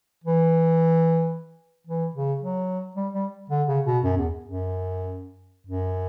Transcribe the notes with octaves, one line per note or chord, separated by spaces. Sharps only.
E3
E3
C#3
F#3
G3
G3
D3
C#3
B2
F#2
E2
F#2
F#2